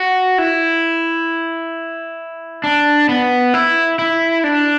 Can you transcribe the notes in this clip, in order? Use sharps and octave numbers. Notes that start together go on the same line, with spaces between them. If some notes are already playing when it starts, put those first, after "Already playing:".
Already playing: F#4
E4
D4
B3
E4
E4
D4